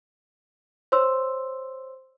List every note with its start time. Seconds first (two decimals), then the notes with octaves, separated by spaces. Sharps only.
0.92 C5 C#5 C6 E6